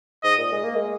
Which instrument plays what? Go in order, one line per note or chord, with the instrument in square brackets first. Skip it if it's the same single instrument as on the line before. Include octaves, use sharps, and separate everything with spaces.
[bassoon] G#2 [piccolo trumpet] D#5
[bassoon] A#2
G#3
A#3
G#3